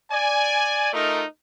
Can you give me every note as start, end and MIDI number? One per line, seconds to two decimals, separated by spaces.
0.11 0.89 74
0.11 0.89 80
0.93 1.23 57
0.93 1.23 63
0.93 1.23 65
0.93 1.23 70
0.93 1.23 75